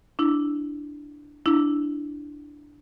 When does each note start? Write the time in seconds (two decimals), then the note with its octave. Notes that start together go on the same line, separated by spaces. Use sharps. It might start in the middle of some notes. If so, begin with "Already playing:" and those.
0.19 D4 E4
1.46 D4 E4